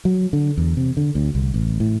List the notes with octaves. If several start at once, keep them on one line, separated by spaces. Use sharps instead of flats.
F#3
D3
E2
C3
D3
D2
C2
A1
A2